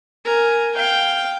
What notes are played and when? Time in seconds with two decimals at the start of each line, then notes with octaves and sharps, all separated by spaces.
0.25 A#4 G#5
0.75 F5 G5